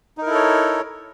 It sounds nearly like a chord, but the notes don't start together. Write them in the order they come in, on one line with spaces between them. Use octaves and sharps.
D#4 A#4 E4 A4 C#5